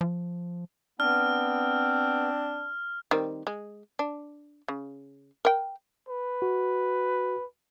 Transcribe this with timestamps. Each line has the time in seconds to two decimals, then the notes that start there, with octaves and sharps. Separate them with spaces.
0.01 F3
1.00 B3 C4 D4 F6
3.11 D#3 G3 C4
3.47 G#3
3.99 D4
4.68 C#3
5.45 A#4 G5
6.09 B4
6.42 F#4